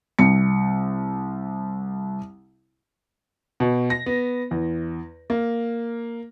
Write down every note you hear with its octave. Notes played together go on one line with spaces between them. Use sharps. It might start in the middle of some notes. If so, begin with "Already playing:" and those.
C2 C#7
B2
A#6
B3
E2
A#3